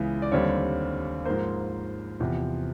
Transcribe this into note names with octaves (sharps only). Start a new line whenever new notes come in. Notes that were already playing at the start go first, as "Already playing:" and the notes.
Already playing: C#2 C#3 E3 B3
D5
D#2 D3 G3 C4 C#5
G#2 F3 A#3 C5
E2 C3 F3